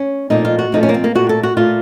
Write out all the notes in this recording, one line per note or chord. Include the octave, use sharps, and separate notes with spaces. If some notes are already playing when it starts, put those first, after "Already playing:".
Already playing: C#4
A#2 F3 A3 D#4
F4
F#4
A#2 F3 A3 D#4
C#4
A#3
C4
A#3
A#2 A3 F#4
A4
F#4
A#2 A3 F4